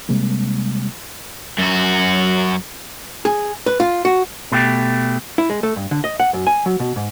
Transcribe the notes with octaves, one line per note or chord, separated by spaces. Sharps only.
C3 G3 G#3 A#3
F#2 F#4
G#4
B4
F4
F#4
B2 A3 G4
E4
G#3
A3
G2
D3
D#5
F#5
F#2
G#5
F#3
B2
G#2